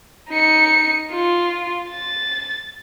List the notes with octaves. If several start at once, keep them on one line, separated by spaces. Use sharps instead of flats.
D#4 C#7
F4
A6